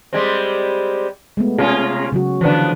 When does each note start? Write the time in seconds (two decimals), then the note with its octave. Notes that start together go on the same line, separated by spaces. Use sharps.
0.13 G3 G#3 C4
1.37 G#3 A3 B3
1.58 C3 C#4 F4 G#4
2.12 C#3 F#3 F#4
2.41 D3 E3 F3 B3 D4